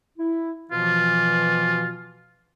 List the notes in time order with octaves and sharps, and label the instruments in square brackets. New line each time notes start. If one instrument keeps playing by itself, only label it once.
[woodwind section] E4
[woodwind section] B2 E3 F3 [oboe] F4